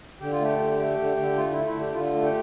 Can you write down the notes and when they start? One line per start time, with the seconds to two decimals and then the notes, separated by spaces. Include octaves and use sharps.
0.21 D3 G4
0.32 F4
0.40 A3 G4
0.59 D3
0.79 A3
0.98 D3
1.17 D3
1.36 A3 F4
1.51 A3 E4
1.65 E4
1.75 D3
1.80 G4
1.93 D3 F4
2.14 A3
2.23 G4